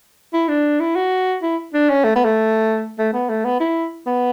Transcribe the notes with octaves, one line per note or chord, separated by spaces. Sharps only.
E4
D4
E4
F#4
E4
D4
C#4
A3
B3
A3
A3
B3
A3
B3
E4
B3